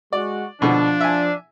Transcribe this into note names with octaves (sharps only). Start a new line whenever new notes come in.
G#3 F#4 D5
B2 D3 F3 D4
E5 G#5